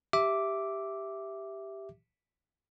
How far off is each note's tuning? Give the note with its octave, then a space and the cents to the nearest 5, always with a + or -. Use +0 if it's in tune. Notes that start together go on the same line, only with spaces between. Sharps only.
G4 +0 E5 +0 D6 -5